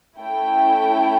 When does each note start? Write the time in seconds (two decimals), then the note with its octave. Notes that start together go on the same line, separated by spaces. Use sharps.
0.19 A3 C#4 E4 A4 G5